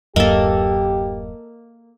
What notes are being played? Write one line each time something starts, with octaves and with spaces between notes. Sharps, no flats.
D1 F#2 A#3 G4 A4 D#5